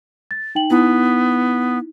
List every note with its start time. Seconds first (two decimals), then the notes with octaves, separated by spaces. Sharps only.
0.31 A6
0.55 D#4 G5 F#7
0.70 B3 D#4 E4